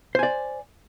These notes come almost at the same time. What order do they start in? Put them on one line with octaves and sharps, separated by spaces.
C5 G#5 D5